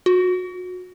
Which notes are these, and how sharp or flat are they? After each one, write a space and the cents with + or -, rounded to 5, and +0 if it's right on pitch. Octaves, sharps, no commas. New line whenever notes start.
F#4 -30